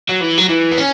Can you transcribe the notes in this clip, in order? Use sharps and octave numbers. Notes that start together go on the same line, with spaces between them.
F#3
E3
F#3
E3
B3
C#4